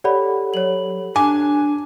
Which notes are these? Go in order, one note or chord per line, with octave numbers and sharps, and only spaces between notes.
G4 A4 C#5 D5 F#5 B5
F#3 C#5 F#7
D4 G#5 D6